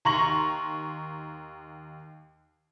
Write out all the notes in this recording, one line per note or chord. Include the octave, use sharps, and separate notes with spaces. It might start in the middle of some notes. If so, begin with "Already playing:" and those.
D#2 A#5 C6 C#6 A#6 F#7